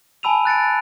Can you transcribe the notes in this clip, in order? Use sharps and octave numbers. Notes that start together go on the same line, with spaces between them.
G#5 A5 B5 E6 D#7 F7
F#6 A6 C#7 D7